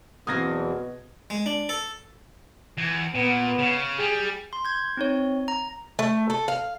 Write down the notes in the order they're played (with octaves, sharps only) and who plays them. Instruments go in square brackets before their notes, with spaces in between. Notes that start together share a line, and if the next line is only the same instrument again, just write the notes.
[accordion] E2 [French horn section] B2 [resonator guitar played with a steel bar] F#3 A#3 C4 [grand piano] D#6 G#6 A#6
[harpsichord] G#3
D4
A4
[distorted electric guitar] E2
[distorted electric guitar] A#2 [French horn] B3
[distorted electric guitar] C#3
[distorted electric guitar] G3 [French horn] G#4
[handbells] C6
G6 G#6
C4 D#4 C#5
A#5
[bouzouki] A3
A4
F5